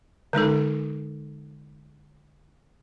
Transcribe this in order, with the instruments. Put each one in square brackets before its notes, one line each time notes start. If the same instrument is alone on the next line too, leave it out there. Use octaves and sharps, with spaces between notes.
[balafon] D3 G#3 D#4 A4